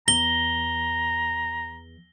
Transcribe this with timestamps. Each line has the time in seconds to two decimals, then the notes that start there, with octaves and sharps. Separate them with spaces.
0.08 E2 A#5 A#6 G7